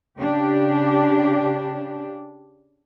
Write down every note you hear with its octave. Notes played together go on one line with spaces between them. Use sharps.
C#3 D4 G4